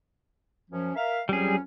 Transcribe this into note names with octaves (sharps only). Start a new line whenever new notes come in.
F#2 F3 C#4
A#4 E5 F5
F2 F#3 G3 C#4 G#4